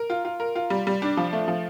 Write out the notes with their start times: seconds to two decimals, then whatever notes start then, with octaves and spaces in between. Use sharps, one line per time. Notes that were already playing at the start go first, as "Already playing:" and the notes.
Already playing: A#4
0.10 F4
0.25 F4
0.40 A#4
0.55 F4
0.70 G3
0.87 G3
1.02 D4
1.17 F3
1.33 A3
1.48 F3